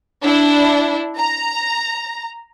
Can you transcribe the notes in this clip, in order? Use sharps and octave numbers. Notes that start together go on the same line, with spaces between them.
D4 E4
A#5